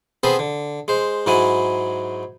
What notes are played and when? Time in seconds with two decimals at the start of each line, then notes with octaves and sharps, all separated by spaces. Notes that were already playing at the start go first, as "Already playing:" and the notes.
0.23 B3 C4 G#4 A4 B4 C5
0.39 D3
0.88 G#3 C5
1.26 G#2 F#3 G#3 E4 G#5